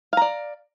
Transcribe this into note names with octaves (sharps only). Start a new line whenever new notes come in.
D5 F5 A#5